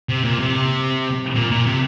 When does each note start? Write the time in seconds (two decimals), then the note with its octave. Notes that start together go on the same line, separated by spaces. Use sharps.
0.09 C3
0.25 A#2
0.40 C3
1.35 A#2
1.51 A#2
1.66 C3